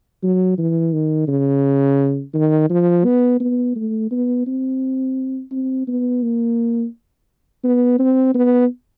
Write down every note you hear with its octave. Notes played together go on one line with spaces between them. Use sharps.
F#3
E3
D#3
C#3
D#3
F3
B3
B3
A3
B3
C4
C4
B3
A#3
B3
C4
B3